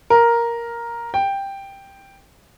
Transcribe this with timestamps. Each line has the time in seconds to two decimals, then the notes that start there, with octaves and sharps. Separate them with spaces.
0.10 A#4
1.14 G5